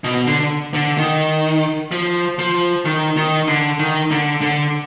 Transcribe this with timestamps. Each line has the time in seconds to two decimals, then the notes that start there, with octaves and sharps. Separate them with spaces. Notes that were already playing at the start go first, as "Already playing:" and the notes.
0.04 B2
0.27 D3
0.74 D3
0.98 D#3
1.92 F3
2.39 F3
2.85 D#3
3.17 D#3
3.48 D3
3.80 D#3
4.11 D3
4.42 D3